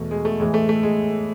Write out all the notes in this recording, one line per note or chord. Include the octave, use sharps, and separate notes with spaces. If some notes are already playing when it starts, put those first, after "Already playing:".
Already playing: E2 B2 A3
G#3
A3
A2 E3 G#3
A3
A3
G#3